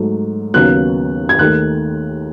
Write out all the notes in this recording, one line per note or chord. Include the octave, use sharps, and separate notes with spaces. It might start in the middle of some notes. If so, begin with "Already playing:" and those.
Already playing: G#2 F#3 A3
D#2 C#3 F#3 B3 F#6
G#6
D#2 D#3 A3 F#6